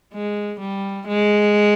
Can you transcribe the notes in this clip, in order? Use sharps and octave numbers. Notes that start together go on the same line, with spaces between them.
G#3
G3
G#3